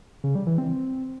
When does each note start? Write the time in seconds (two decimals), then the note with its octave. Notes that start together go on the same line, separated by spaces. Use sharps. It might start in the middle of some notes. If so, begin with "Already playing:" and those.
0.24 C#3
0.35 G3
0.47 E3
0.58 C4